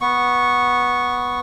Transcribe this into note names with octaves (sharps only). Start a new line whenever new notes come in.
B3 C#6